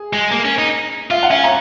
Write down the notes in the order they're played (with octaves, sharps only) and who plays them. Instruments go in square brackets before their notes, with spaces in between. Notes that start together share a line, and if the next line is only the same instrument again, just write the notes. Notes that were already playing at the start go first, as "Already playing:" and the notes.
Already playing: [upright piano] G#4
[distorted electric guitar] G#3
[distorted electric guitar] A#3 [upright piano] A#4
[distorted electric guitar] C#4
D#4
[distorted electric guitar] F4 [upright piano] F5
[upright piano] F#5
[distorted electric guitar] C#4 [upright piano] F5
[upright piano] A#5